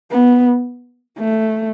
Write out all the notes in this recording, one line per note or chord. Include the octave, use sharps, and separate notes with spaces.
B3
A3